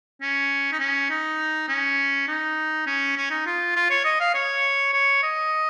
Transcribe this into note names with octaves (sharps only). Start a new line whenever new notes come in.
C#4
D#4
C#4
D#4
C#4
D#4
C#4
C#4
D#4
F4
F4
C#5
D#5
F5
C#5
C#5
D#5